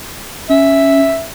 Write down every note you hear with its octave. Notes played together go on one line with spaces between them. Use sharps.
C#4 E5